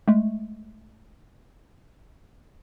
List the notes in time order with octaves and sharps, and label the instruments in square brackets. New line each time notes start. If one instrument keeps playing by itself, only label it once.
[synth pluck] G#3 A3